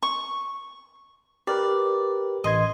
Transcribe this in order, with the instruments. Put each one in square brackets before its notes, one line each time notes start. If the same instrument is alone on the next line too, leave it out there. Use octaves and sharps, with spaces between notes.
[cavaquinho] C#6
[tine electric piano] G4 A#4 B4 [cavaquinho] D5
[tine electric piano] A1 C6 G#6 [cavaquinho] D#5